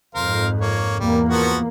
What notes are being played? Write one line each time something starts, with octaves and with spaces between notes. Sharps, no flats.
F2 G#2 A#4 C5 F5
A#3 C#5
E2 G3 A#3
F3 B3 F#4